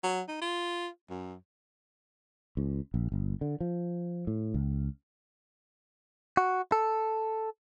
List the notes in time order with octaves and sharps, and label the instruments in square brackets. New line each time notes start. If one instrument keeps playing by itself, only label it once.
[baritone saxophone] F#3
D#4
F4
F#2
[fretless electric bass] C#2
A#1
G1
D3
F3
A2
C#2
[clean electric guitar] F#4
A4